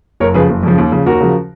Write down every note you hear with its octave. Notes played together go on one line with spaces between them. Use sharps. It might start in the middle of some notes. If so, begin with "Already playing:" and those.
F#1 A#4 C#5
F2 C#3 F3 G#4 B4
F#1
F2 C#3 F3
D#2
C#3 F3
D#2 F#4 A#4
C#3 F3